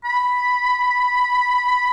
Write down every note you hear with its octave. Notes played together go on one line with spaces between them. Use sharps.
B5